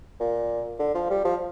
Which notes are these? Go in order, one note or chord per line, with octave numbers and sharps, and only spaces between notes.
A#2
D3
F3
G3
F3